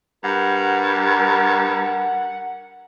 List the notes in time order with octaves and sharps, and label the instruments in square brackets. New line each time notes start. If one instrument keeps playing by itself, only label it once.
[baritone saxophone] G2 [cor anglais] A#4 [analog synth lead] F#5